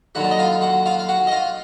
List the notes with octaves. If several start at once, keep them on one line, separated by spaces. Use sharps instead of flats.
D#2 D3 F#3 F#4 F#5
D5
D#5
F4 F5
F#4 F#5
F4 F5
F5
F#4 F#5
D#5
F4 F5